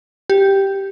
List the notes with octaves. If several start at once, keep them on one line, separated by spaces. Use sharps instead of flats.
G4